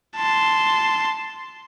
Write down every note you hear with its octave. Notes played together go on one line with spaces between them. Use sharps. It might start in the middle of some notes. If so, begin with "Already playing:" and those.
A5 C6